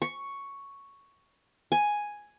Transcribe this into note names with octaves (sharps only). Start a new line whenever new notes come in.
C#6
G#5